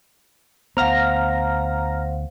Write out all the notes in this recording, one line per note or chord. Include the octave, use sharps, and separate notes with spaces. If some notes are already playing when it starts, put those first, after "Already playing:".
D2 B3 C5 F5 F#5 A#5 F6 A#6